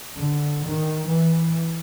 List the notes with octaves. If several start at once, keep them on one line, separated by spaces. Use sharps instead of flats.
D3
D#3
E3